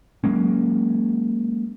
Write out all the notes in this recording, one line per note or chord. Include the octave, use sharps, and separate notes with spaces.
F#3 G#3 A#3 C#4